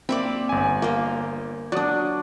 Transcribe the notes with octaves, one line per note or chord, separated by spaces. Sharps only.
A#3 C4 D5 E5 B5
G1 G#5
A#3 C5
F#3 D4 D5 D#6